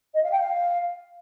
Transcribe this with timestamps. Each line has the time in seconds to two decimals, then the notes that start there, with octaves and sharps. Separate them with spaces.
0.14 D#5
0.23 F5
0.31 G5
0.40 F5